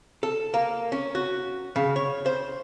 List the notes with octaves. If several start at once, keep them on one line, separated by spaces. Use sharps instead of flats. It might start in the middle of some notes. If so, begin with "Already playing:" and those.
A4
A#3
C#4
F#4
C#3
C#5
C5